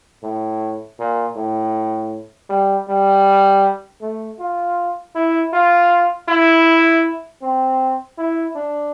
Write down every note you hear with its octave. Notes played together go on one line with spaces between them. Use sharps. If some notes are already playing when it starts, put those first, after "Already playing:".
A2
A#2
A2
G3
G3
A3
F4
E4
F4
E4
C4
E4
D4